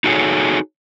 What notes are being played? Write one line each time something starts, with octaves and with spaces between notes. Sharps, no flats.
D#4 F#4 G#4 A4 C#5